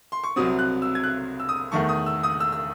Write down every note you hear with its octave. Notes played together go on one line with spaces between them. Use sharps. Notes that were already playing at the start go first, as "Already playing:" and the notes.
C6
C#6
C2 C3 F#3 C4 D#6
F#6
E6
G#6
F#6
E6
D#6
E2 D#3 A3 C#6
D#6
E6
D#6
E6
E6